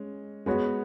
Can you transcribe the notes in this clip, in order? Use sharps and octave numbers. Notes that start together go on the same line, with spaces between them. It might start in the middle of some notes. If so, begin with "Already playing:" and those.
Already playing: G#3 C#4
G#3 B3 F#4 C#5